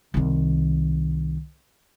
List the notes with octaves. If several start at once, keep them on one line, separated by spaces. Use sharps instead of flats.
C2 D#3